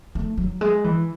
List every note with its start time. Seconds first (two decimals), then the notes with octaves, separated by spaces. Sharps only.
0.15 A3
0.37 F#3
0.61 G#3
0.84 E3